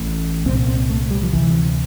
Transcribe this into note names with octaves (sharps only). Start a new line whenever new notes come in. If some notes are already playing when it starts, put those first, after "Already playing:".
Already playing: A1 A2
C2 A#2 C4
C4
A3
G3
F3
D2 C3 E3